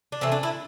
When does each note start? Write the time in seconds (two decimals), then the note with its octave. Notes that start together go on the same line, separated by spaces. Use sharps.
0.12 D4
0.21 C3 E3 A3 C4
0.32 D4
0.43 E4